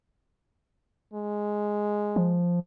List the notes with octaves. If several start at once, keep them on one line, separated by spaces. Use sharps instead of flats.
G#3
F3